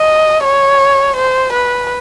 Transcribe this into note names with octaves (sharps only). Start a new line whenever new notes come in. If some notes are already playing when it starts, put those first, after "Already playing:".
Already playing: D#5
C#5
C5
B4